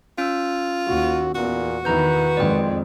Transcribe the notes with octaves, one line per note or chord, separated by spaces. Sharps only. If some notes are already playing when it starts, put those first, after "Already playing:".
C#4 F4 E6
D#2 F#4
E2 A#2 F#4
E2 D#3 E3 B4 A#5 G6
F2 D#3 G#3 D5 G5